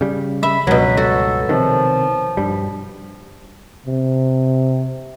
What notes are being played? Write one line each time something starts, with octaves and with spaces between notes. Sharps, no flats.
C#3 G3
E5 B5
C#2 G2 B2 F#3 B4
F#4 A4
C3 D#3 F3
G2 G3
C3